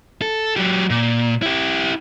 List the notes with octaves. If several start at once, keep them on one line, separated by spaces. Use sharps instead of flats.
A4
F#3 G4
A#2
E4 G4